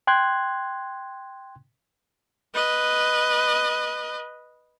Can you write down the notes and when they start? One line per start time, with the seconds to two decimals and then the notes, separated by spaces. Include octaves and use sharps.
0.07 G5 C6 F#6 G#6
2.54 B4 D#5